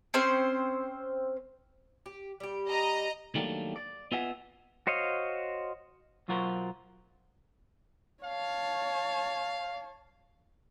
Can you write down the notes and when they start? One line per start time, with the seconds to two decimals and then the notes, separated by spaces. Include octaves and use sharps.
0.14 C4 C#4 C5
2.06 G4
2.40 G3 G4
2.69 D#5 A#5
3.35 D#3 F#3 G3 A3 A#3 D4
3.76 D5
4.12 B3 F4 D#5 E5 F#5 G#5
4.87 F#4 C5 C#5 D#5 F5
6.28 B1 F#3 F4 F#4 A#4 C5
8.24 C#5 F5 A5